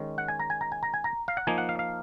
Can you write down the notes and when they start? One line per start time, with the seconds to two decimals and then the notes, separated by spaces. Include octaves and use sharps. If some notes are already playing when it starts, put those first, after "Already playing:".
Already playing: D#3 G#3 C#4
0.18 F#5
0.28 G#5
0.40 A#5
0.50 G#5
0.61 A#5
0.72 G#5
0.83 A#5
0.94 G#5
1.04 A#5
1.28 F5
1.37 F#5
1.47 F3 A#3 D#4 G#5
1.58 F#5
1.69 F5
1.79 F5